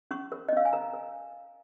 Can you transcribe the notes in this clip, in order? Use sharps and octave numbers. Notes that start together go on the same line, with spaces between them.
C#4 C#6
A#4
D#5
C#4 F5
G#5
A#4 A#5
A#4